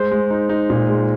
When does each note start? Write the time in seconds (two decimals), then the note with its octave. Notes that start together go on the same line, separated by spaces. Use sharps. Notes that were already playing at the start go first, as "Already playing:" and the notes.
Already playing: G#3 C5
0.11 G#3
0.31 D#4
0.49 D#4
0.70 A#2
0.88 G#3